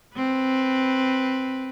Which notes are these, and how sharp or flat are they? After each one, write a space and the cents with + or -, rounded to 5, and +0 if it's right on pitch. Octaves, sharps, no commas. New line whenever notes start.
C4 +0 B4 +0